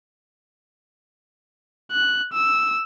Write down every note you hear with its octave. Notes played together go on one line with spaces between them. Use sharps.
F#6
E6